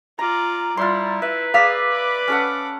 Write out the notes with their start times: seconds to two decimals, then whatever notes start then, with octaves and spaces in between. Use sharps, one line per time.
0.19 F4 D5 A#5
0.77 G3 E4 F4 C6
1.22 B4 E5
1.54 G#4 D5 F5 E6 B6
1.92 B5 D6
2.28 C#4 A4 F#5